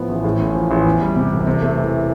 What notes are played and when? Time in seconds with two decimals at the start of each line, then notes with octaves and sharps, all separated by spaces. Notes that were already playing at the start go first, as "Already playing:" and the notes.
Already playing: A2 F3 B3
0.09 A1
0.24 A2
0.40 A1
0.55 F3
0.71 A1
0.86 E2
1.01 G3
1.16 C3
1.32 E1
1.47 C3
1.62 A3
1.77 E3